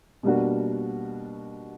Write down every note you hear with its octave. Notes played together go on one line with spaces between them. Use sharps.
B2 G3 A#3 D4 F#4